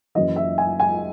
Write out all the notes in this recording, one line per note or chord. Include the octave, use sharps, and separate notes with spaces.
F#1 F#2 E3 D#5
E5
G#5
G#5